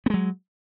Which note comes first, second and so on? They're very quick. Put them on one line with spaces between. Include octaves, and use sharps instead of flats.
B3 G#3 F#3